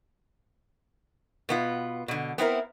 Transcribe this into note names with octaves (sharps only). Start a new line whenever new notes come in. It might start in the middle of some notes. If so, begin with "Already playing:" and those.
B2 B3 F4
B2 D3
B3 C4 E4 A#4